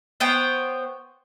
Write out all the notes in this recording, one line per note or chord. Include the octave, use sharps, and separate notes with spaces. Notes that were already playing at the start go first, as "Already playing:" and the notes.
B3 C5 C#5 G5